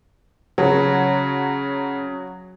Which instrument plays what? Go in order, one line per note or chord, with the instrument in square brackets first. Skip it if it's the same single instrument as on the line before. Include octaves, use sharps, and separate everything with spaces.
[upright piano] C#3 [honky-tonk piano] F#3